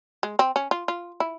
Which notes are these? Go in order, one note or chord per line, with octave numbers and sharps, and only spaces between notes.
G#3
C4
C#4
F4
F4
E4